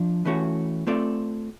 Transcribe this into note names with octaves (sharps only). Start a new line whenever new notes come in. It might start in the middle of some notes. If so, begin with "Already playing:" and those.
Already playing: F3 D4
E3 A3 C#4 F#4
A3 C4 F4 A4 D5